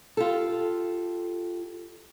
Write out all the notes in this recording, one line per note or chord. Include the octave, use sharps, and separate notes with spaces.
F4 G4 A4